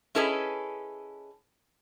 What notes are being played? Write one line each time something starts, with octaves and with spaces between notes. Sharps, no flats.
C#4 E4 G#4 A4 B4 D#5